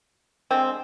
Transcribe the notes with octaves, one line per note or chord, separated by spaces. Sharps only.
D3 F3 G#3 C4